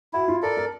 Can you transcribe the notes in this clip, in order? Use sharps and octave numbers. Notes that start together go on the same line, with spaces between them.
E4 F#4
F4
A4 A#4 D5
A#4